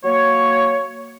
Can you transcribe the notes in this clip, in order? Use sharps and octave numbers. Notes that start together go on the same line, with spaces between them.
F#3 A#3 C#5